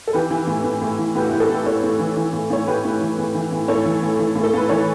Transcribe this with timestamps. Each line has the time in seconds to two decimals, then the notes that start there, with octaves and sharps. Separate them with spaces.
0.08 A4
0.13 E3 G4 B4
0.30 E3
0.47 A2
0.64 A2
0.82 A2
0.98 E3
1.15 A2 G4 B4
1.22 F#4
1.27 A2 E4 G4
1.40 F#4 A4
1.49 A2 G4 B4
1.66 A2 A4 C#5
1.83 A2
1.99 E3
2.17 E3
2.33 A2
2.50 A2 C#5
2.67 A2 G4 B4
2.85 A2
3.01 E3
3.18 A2
3.35 E3
3.52 A2
3.68 A2 A4 C#5
3.86 E3
4.03 A2
4.19 E3
4.36 A2
4.44 A4
4.54 A2 B4
4.69 E3 A4 C#5